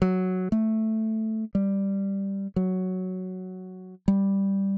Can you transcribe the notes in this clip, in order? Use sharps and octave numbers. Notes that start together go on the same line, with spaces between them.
F#3
A3
G3
F#3
G3